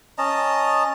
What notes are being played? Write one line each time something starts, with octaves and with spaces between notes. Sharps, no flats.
C#4 D#5 A5 A#5